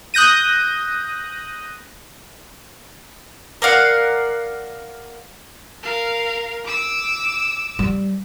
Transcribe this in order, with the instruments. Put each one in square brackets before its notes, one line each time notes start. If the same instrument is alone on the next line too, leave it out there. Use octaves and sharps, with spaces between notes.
[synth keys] D#6 F#6 G6 A#6 D#7
[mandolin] A#4 D5 F5 F#5
[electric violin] A#4 F5
D6 E6
[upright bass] G3